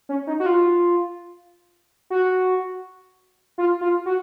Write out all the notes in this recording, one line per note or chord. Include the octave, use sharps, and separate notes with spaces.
C#4
D#4
F#4
F4
F#4
F4
F4
F#4